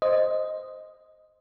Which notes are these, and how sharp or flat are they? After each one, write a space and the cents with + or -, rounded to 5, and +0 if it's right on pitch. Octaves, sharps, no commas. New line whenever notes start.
C5 +0 D#5 +0